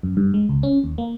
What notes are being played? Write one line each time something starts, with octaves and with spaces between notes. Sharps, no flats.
F#2
G2
G#3
C#2
C#4
D#2
A#3